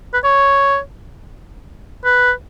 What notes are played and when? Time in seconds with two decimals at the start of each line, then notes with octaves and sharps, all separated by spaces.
0.14 B4
0.24 C#5
2.05 B4